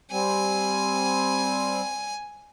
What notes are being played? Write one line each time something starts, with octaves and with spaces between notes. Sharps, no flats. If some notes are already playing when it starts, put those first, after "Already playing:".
G3 C4 G#5